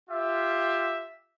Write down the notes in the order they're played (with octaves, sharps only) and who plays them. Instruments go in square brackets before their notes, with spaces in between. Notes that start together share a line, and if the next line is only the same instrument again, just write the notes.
[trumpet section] F4 G4 E5